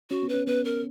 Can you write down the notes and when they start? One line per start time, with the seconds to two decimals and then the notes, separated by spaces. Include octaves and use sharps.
0.10 C#4 F#4
0.23 B3
0.29 C#4 B4
0.47 B3 B4
0.65 A#4